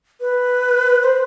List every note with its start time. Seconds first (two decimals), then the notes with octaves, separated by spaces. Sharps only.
0.21 B4
1.03 C5